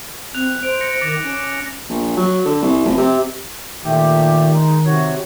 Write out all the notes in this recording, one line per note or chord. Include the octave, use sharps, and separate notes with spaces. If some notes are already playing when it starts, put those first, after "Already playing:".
C4 F#6 F7
C5 D7
A#6 C#7
D#3 D6 A6 A#6
C#4
A#1
F#3
D3
C2
F1
C3
A#2 D#3 A3 G4
G#3 D#4
C3 F#4 C#5